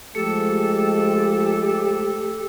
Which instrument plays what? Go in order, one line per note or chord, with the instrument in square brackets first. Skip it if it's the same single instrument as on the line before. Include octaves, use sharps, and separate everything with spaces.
[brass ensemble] F3 G#3 [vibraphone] A3 [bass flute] G4 [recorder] A4